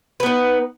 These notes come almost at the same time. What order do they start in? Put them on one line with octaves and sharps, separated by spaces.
B4 B3 D#4